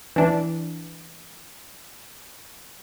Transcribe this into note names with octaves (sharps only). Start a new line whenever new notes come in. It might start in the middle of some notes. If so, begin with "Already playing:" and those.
E3 D4